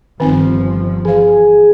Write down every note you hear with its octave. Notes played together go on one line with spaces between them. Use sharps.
G1 D#3 F3 C4 D#4
E3 G#4 F5